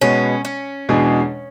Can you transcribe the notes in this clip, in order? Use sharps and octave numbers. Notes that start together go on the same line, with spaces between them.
B2 G#3 B3 C#4
C#4
E2 B2 G#3 D4 G#4